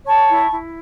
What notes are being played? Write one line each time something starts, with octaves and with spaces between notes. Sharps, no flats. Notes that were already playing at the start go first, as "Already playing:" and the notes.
C#5 A5 C#6
E4
E4